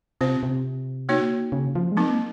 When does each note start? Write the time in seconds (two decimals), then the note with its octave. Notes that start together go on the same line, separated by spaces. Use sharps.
0.21 C3 C4 F4 C5
0.43 C3
1.09 A#3 D#4 F#4 C#5
1.52 C#3
1.75 F3
1.92 G#3
1.97 F#3 A#3 C4 D#4